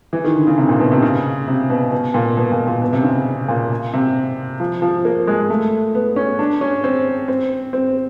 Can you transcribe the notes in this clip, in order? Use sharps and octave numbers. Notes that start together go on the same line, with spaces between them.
E3
D#3
D3
C#3
C3
A#2
B2
C3
C#3
C3
B2
B2
A#2
B2
A#2
A#2
B2
C3
C#3
A#2
C3
F3
F3
A#3
G#3
A3
B3
C#4
D4
C#4
C4
C4
C4